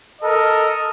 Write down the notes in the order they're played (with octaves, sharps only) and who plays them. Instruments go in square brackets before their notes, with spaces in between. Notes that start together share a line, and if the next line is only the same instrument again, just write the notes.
[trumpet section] A4 A#4 D#5